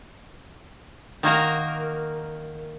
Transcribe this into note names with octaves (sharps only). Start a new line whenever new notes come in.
D#3 A#3 F#4 A#4